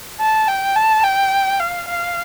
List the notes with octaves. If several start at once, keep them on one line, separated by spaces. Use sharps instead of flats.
A5
G5
A5
G5
F5
F5